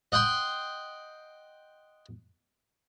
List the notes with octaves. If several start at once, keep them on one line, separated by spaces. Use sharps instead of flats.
D#5 F#5 G5 C6